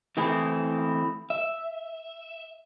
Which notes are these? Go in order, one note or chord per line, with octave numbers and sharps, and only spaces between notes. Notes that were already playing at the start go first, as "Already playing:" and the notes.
E3 A3 C4 E4 G#4
E5